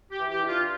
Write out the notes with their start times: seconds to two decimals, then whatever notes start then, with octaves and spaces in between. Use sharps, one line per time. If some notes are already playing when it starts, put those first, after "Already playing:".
0.11 G4
0.18 E3
0.30 G4
0.43 D4
0.49 F4